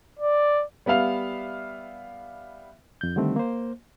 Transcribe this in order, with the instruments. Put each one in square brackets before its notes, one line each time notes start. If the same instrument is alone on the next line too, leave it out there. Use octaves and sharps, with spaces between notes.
[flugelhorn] D5
[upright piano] G3 B3 E5 F5 F7
[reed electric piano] F2 G6
D3 D#3 G3 A3 C4
A#3 C5